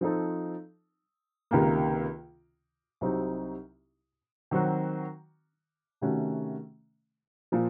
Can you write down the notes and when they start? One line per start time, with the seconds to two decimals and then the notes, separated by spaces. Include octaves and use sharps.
0.01 F3 C4 D#4 A4
1.51 C#2 C3 D#3 A#3
3.01 C2 C3 F#3 C4 D#4
4.51 D#3 F#3 C4 F#4
6.01 C3 D#3 A3 C#4 F#4
7.52 A#2 F3